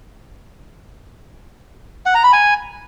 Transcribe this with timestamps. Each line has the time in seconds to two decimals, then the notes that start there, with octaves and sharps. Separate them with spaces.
2.06 F#5
2.15 A#5
2.24 B5
2.33 G#5